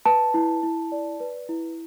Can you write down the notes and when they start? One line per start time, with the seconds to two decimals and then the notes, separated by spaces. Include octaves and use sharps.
0.05 B4 A5
0.34 E4
0.63 E4
0.92 D5
1.20 B4
1.49 E4